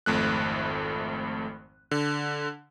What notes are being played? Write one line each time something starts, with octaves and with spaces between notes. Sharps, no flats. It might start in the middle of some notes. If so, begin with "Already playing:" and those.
G#1 F2 A3 F#6
D3